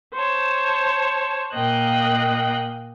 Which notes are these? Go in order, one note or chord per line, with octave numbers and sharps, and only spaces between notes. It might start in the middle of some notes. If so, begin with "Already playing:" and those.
C5 C#5 A5
A#2 A#3 D#5 G5 F#6